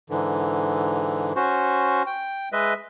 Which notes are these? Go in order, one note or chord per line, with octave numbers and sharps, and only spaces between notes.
G#2 D3 E3
C#4 F#4 C5
G5
G#3 B4 D#5 E5